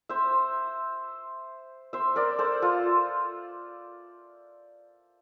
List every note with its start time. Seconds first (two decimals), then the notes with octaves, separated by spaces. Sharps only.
0.09 C5 E5
1.93 C5 E5
2.16 A#4 D5
2.39 A4 C5
2.62 F4 A4